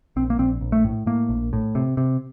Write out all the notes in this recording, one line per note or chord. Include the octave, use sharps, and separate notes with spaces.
A#1 C4
A#3
A#1 C4
A#1
A3
A2
A2 A#3
A#1
A2
C3
C3